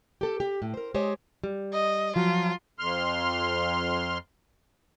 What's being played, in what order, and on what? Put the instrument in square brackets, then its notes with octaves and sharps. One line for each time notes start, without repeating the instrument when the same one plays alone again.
[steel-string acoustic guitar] G4 A4
G4
A2
A#4 C5
G#3 G4 C5 C#5 D#5
[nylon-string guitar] G3
[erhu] D#5
[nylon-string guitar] F3 F#3 [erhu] F4
[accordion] F2 C6 F6